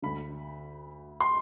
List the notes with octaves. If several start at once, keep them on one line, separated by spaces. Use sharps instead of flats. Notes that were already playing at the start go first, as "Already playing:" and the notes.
D2 D3 B5
C6